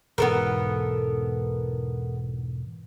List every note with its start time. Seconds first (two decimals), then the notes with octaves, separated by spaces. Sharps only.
0.18 E1 G#2 B3 A4 A#4